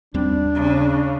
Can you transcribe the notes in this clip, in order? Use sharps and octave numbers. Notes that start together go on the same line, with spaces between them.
D#2 G3 C4 D4
C#3